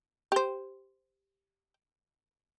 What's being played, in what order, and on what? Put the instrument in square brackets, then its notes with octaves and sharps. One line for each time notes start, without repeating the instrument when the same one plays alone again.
[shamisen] G4 C5